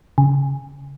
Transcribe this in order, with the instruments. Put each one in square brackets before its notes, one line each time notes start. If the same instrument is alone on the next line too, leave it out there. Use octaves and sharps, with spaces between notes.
[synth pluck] C#3